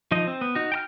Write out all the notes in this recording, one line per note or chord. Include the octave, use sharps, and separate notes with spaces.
F3 D#4 D#5
C4
B3
D#4 F#4
G5 A#5 F6